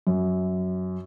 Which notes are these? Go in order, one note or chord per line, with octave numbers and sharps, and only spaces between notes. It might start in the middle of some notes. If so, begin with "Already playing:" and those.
F#2